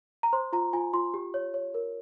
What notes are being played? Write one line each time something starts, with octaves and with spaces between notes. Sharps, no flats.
A#5
C5 C6
F4 A#5
F4 G#5
F4 C6
G4
C#5
C#5
A#4